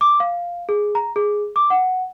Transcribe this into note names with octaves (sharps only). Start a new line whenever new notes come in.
D6
F5
G#4
A#5
G#4
D6
F#5